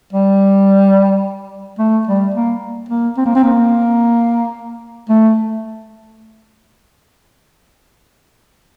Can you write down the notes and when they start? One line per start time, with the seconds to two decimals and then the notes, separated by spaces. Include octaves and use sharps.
0.13 G3
1.79 A3
2.07 G3
2.34 A#3
2.89 A#3
3.17 C4
3.26 A#3
3.35 C4
3.44 A#3
5.10 A3